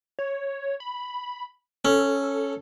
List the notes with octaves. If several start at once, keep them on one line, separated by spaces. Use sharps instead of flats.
C#5
B5
C#4 A4